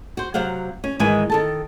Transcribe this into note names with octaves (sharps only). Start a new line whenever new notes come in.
F#4 C5
C3 F#3 C5 F5 F#5
C#4
G#2 D#3 E3 G#3 B4 G#5
D#3 A4 A5